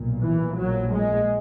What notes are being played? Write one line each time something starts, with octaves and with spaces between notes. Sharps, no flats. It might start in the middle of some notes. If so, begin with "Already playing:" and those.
Already playing: B1 A#2
E3
A#1 A#2 F#3
G#3